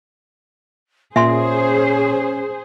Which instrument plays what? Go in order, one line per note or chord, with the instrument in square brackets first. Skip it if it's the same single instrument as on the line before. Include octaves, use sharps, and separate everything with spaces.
[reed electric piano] A#2 [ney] C#4 [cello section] G#4 C5 [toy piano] E5 G#5 C6